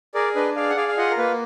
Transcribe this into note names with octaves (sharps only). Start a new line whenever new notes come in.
G#4 A#4 D5
D4 B4 D#5
G#4 D5 F5
F#5
G#4 D5 F5
F5
F4 D#5 F#5
A#4
A#3 B4